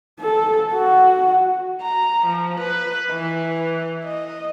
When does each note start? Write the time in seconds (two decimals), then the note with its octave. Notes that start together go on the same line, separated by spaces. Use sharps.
0.20 A4
0.73 F#4
1.82 A#5
2.26 F3
2.60 B4
3.12 E3
4.04 D#5